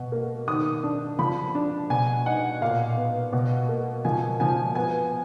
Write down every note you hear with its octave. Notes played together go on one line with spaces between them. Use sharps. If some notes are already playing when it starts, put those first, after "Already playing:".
Already playing: B2
A#3
D#3 D#6
D4
F3 B5
D4
B2 G#5
D#4 F#5
A#2 F5
B3
B2
A#3
F3 G#5
F3 G#5
B3 G#5